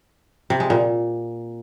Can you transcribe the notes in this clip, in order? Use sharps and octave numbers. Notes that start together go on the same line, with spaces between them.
C3
G#3
A#2